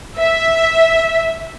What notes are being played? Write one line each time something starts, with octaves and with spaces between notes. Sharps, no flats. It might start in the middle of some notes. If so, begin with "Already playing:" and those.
E5